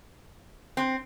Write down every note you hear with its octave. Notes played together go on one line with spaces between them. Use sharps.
C4